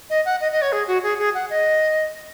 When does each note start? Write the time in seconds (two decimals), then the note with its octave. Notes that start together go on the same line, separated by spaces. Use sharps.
0.10 D#5
0.25 F#5
0.40 D#5
0.51 D#5
0.62 C#5
0.72 G#4
0.87 F#4
1.03 G#4
1.18 G#4
1.34 F#5
1.50 D#5